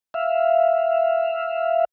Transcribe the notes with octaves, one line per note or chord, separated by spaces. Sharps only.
E5 F5